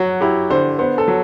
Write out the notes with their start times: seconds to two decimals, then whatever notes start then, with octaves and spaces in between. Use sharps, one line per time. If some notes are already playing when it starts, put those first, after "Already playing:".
Already playing: F#3 F#4
0.21 E4 G4
0.50 D3 C5
0.79 B3 C5
0.98 A4
1.08 F#3